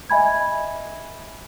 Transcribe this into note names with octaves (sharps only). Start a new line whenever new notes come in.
D#5 E5 G#5 B5 G#6